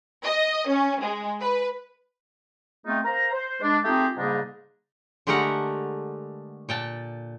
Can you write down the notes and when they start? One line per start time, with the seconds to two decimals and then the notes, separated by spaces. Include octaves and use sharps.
0.25 D#5
0.67 C#4
1.02 G#3
1.41 B4
2.86 G#3 A3 B3 C4 D#4 F4
3.05 A#4 C5 F5 A#5
3.33 C5
3.62 G#3 D4
3.85 A3 C4 D#4 F4 G4 G#4
4.17 G#2 C#3 G3 A#3 D4 D#4
5.27 D3 G#3 A3 G4 A#4 F#5
6.69 A#2 G5 A5